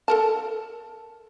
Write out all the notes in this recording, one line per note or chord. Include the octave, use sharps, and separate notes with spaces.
A4 A#4 A5